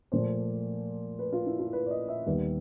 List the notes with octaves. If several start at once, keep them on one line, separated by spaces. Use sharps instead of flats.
A#2 F3 A3 C5
B4
F4
E4
F4
B4
D5
D#5
E5
D#2 D#3 G3 B3